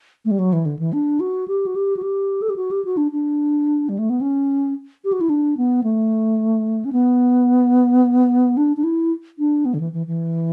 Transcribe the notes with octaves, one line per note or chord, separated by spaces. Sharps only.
A3
G3
F#3
E3
D3
E3
D4
F#4
G4
F#4
G4
F#4
G4
A4
G4
F#4
G4
F#4
D4
D4
G3
A3
B3
C#4
G4
F#4
E4
D4
B3
A3
C#4
B3
D4
D4
E4
D4
B3
D3
E3
E3
E3